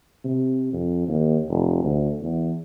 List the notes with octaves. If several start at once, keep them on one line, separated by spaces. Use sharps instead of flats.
C3
F2
D#2
F1
D2
E2